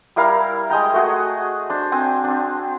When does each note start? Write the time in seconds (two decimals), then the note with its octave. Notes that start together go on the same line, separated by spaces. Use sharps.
0.16 G3 E4 A#4 F5
0.70 G#3 D#5 G5 A#5
0.94 A3 F#4 G#4
1.70 D4 C5
1.92 C4 G#5
2.24 C4 D4